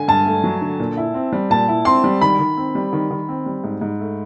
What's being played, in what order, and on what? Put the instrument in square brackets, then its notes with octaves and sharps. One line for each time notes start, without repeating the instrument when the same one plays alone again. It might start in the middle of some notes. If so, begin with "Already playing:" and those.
Already playing: [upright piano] D3 [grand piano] G#5
[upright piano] G2 [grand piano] A5
[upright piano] A3
F#3
D3
A#2
E4
C4
G3
[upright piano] A#2 [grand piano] A5
[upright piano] E4
[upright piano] C4 [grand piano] C6
[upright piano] G3
[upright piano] D#3 [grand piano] B5
[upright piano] D#3
C4
G3
D#3
D#3
C4
G3
G#2
G#2
A3